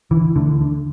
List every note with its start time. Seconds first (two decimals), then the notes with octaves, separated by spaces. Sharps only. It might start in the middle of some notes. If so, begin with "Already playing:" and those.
0.11 D3 E3
0.36 D2 D3
0.61 D3